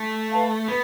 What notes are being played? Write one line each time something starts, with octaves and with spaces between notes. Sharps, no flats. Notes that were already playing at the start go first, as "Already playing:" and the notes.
Already playing: A3
B4 F5 A5
B3 B4